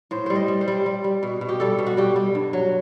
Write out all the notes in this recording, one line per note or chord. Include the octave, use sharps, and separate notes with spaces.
A2 C5
G3 C5
D#5
G3
C5
G3
G3
G3
B2
B2
G4
G3 A4
B2
F#4
G3 G4
G3
G2
F#3